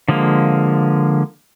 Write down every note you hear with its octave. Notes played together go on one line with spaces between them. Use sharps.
D3 F3 G#3 A#3